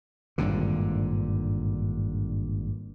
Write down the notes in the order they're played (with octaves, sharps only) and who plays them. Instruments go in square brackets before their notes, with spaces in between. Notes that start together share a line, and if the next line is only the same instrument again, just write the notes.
[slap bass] G#1 G2 A#2 D3